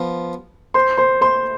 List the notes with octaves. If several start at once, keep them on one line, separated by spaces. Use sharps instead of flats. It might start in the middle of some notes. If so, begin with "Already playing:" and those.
Already playing: F3 B3
C5 C6
C5 C6
C5 C6